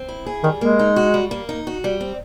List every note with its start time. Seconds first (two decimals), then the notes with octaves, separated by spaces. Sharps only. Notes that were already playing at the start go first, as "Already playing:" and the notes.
Already playing: C4
0.09 E4
0.26 G#4
0.44 D#3 G3
0.61 G#3 A#3
0.79 D#4
0.96 F#4
1.14 G3
1.31 A#3
1.49 D#4
1.67 F#4
1.84 G3
2.01 C4